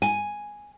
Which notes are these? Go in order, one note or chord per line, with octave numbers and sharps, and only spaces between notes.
G#5